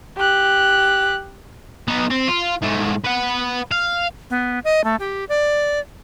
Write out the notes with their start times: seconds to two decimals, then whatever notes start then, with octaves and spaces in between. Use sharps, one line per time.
0.17 G4 F#6
1.88 B3 D#4
2.10 C4
2.28 F4
2.62 G#2 A3
3.05 B4 F#5
3.71 F5
4.30 B3
4.64 D#5
4.84 A3
5.00 G4
5.29 D5